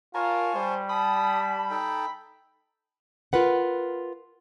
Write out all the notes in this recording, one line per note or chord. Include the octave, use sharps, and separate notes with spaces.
F4 A#4 C#5 G#5 A5
G3 C5
A5 B5 D#6
D#4 A4 G5
F4 A#4 B4 F#5